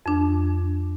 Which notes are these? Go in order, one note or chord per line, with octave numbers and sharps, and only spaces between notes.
F2 D4